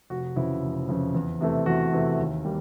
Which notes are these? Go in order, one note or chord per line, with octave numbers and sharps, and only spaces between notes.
F1 F#4
F2 C#3 E3 E4
F1
F2 C#3 E3
E2
C3 E3 A3
E2 F#4
C3 E3 A3
D#2
G3 A#3